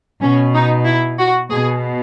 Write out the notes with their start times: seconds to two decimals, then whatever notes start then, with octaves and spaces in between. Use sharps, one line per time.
0.22 B2 C#4
0.55 D#4
0.86 E4
1.19 F#4
1.50 B2 G#4